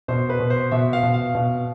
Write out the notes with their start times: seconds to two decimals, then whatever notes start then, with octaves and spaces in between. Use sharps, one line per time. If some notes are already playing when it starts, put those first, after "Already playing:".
0.08 B2 C5
0.30 B4
0.40 B2
0.50 C5
0.72 B2 E5
0.93 F5
1.03 B2
1.14 F5
1.35 B2